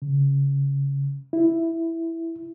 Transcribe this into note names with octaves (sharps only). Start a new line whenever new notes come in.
C#3
E4